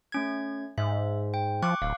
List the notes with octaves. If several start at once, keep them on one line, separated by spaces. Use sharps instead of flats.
A3 C#4 G#6
G#2 E5
G5
F3 C#6 D6 F#6
D1 F5